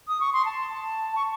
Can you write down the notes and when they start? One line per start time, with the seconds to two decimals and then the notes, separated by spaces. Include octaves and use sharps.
0.08 D#6
0.20 C#6
0.33 C6
0.45 A5
1.16 C#6